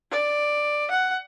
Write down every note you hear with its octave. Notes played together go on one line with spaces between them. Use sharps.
D5
F#5